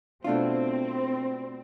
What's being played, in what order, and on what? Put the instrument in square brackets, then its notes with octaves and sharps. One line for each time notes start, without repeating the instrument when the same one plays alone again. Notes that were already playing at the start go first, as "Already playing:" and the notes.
[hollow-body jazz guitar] B2 A3 D4 F4 [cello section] C4